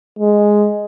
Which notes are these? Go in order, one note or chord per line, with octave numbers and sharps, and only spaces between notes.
G#3